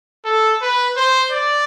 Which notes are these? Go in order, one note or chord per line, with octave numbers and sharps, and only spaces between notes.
A4
B4
C5
D5